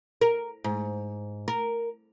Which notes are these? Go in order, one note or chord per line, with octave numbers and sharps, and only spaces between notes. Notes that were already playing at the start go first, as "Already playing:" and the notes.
A#4
G#2
A#4